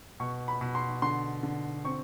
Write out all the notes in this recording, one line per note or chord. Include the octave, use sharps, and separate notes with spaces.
B2 C#6
B5
B2
C6
D3 C6
D3
C4 C#6